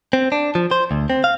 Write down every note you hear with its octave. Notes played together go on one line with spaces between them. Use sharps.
C4
D4
F3
C5
D2
C4
F5